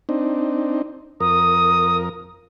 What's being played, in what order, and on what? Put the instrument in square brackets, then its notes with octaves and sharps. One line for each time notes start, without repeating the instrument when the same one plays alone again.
[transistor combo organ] C4 D4 D#4
[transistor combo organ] F2 A#4 [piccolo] D#6